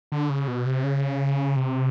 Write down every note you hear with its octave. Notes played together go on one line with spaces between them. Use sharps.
D3
C#3
B2
C3
C#3
C3